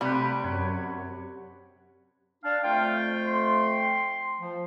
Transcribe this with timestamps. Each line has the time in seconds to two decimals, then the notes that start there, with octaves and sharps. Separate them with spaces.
0.01 C3 G3 A3 G4 B4
0.44 F#2 C#5 F#5 B5
2.44 D4 F5
2.64 F2 A3 F4 G5
3.27 C6
4.41 F3